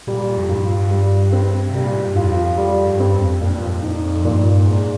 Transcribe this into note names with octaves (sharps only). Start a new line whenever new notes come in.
A#2 G3
F2
G2 F4
G3
C4
C3
G3
A#2
G#2
G2
F2 F4
F2 G3
G2
C4
F2
F2 A#2
G2
F2
D#4
G2 A#2
G2
G#2 G#3